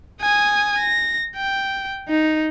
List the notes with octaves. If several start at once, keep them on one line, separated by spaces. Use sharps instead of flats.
G#5 D#6
A#6
G5
D#4